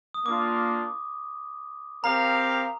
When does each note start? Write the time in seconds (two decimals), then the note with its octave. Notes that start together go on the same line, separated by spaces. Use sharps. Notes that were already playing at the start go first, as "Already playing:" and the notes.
0.14 D#6
0.25 A#3 D4 F4 D6
2.04 C4 G4 A#4 F5 A#5